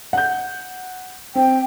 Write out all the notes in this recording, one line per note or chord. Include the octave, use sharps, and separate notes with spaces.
F#5 G6
C4 G5